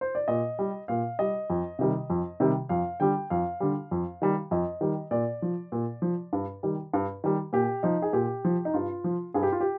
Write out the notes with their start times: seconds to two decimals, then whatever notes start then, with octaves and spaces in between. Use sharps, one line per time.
0.01 C5
0.15 D5
0.28 A#2 D#5
0.59 G3
0.88 A#2 F5
1.19 G3 D#5
1.50 F2
1.79 C3 D#3 G3
2.10 F2
2.40 C3 D#3 G3
2.69 F2 F5
3.00 D3 G3 G5
3.30 F2 F5
3.60 D3 G3
3.91 F2
4.22 D#3 G3
4.51 F2 D#5
4.81 D#3 G3
5.11 A#2 D5
5.42 F3
5.72 A#2
6.02 F3
6.33 G2
6.63 D#3 G3
6.93 G2
7.24 D#3 G3
7.53 A#2 G4
7.83 F3 D#4
8.02 G#4
8.13 A#2 G4
8.45 F3
8.65 D#4
8.74 G2 F4
9.04 F3
9.34 G2 G#4
9.43 G4
9.52 F4
9.61 G4